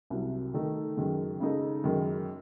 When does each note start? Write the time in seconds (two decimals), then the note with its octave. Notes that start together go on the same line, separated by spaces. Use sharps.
0.10 C2 C3 F#3
0.54 D#3 A3 D#4
0.97 F#2 D#3 G#3
1.40 C#3 G#3 D#4 A4
1.84 F#2 D#3 G#3